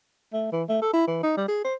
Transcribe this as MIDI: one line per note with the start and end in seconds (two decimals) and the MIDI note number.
0.33 0.48 57
0.52 0.64 52
0.69 0.82 57
0.82 0.93 69
0.93 1.04 64
1.07 1.20 52
1.23 1.35 63
1.37 1.44 55
1.48 1.63 68
1.64 1.75 72